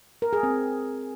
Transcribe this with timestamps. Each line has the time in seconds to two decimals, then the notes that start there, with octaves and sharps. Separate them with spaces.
0.22 A#4
0.33 G#4
0.43 C4